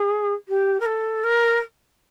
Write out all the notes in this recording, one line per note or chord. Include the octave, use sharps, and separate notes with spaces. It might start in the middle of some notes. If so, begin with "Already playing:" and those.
Already playing: G#4
G4
A#4
A4
A#4